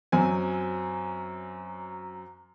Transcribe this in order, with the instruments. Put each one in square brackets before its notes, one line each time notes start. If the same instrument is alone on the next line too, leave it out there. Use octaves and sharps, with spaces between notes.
[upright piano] F#2 F#3 C4 G#5